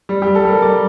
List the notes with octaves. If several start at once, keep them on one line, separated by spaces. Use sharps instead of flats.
G3
G4
G3
A4
G3 A#4
G3 D5